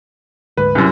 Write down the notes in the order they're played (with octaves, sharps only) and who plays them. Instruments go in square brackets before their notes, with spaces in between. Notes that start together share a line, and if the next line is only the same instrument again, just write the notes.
[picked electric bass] D2 G#2 [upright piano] B4
[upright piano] C2 F#2